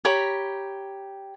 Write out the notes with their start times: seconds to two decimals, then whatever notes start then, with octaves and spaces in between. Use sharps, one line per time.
0.05 G4 C#5 A#5 B5